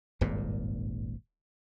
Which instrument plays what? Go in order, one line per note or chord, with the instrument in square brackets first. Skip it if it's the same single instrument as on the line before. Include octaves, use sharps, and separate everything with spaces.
[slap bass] D#1 G#1 G2 A#2